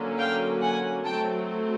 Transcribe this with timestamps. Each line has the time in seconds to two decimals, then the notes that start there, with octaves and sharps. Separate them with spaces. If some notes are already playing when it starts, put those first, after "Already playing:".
Already playing: D3 F#3 A#3 C#4
0.17 F5 G5
0.61 F#5 G#5
1.04 F#3 A3 C4 G5 A5